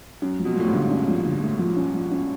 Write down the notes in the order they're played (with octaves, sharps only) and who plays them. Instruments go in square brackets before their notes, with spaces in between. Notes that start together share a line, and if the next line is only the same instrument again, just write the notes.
[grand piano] F#2 [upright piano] C#4
[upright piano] F3
[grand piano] B2
A#2
[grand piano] A2 [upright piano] F3
[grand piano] G#2
[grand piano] G2 [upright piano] D3
[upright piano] C#4
F3
D3
A3
F3
C#4
F3
C#4